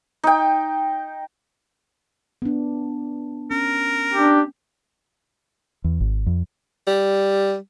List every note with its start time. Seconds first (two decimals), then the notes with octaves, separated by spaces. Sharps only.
0.24 D#4 G5
2.42 B3 D4
3.51 C#4 A#4
4.14 D4 G4
5.84 E2
6.00 G#1
6.26 F2
6.87 G3